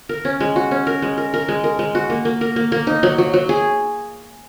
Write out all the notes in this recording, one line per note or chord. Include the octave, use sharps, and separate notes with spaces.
A#4
C#4
G#3
F#4
C#4
A#4
G#3
A#4
A#4
G#3
A#4
G#3
F#4
A#3
A#3
A#4
A#3
A#3
D#4
F#3
F#3
F#3
G#4